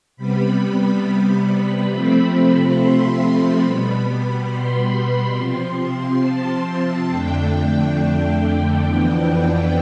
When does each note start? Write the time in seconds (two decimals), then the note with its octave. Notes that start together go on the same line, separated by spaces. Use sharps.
0.17 C3 G3 B3 B5
1.90 C3 F3 A3 C4 B5
2.77 C6
3.20 B5
3.63 B2 G3 B3 B5
4.06 B5
4.50 C6
5.36 C3 F3 C4
6.23 A5
7.09 F2 D3 A3 D4 G5
8.83 F2 E3 B3 D4